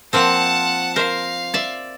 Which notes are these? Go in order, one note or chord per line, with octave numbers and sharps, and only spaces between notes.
F3 A#3 C4 F#5 A5
A#4 C5 F5
D5 E5